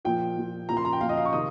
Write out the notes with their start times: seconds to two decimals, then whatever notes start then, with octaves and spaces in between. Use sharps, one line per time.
0.05 A#2 F3 G5
0.37 A#2 F3
0.69 A#2 F3 A#5
0.77 C6
0.85 A#5
0.93 G5
1.01 A#2 F3 F5
1.09 D#5
1.17 F5
1.25 C#6
1.33 C3 D#3 D#6